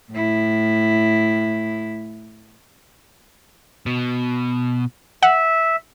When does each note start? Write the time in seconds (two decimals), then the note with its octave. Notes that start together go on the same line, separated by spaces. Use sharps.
0.11 A2 E4
3.86 B2
5.23 E5 F#5